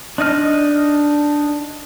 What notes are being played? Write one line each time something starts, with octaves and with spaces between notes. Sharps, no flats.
D4 D#4 D#5 F6